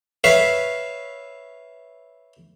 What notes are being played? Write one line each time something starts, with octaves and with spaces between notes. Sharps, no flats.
B4 C#5 E5 F5